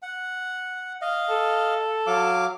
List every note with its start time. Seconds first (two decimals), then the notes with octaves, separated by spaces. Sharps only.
0.02 F#5
1.02 D#5 F5
1.30 A4
2.07 F#3 F5 D6